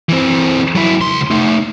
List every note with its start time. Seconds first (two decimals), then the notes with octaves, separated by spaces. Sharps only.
0.09 E3 C4
0.75 F#3 E4
1.01 C#2 C6
1.31 A3 D#4